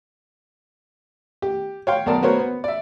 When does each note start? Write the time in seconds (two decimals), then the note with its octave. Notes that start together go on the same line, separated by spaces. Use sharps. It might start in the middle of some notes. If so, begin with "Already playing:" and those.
1.42 G4
1.87 C#5 F5 G5 C6
2.06 B1 A#4 D5 A5
2.22 A#3 B3 F#4 A#4 C5 C#5
2.40 B3
2.64 D5 E5